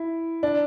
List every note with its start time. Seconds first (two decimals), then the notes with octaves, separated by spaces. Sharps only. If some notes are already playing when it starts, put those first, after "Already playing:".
Already playing: E4
0.43 D4